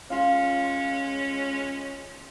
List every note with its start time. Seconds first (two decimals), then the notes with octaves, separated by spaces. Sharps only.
0.10 G#3 C#4 F4